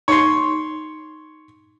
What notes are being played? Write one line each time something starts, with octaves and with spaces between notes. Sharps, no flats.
D#4 C#5 C6